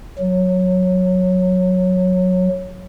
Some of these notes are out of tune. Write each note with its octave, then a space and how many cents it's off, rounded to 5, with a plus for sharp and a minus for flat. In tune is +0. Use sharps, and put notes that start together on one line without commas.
F#3 -10